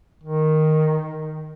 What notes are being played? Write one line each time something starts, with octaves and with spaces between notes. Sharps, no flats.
D#3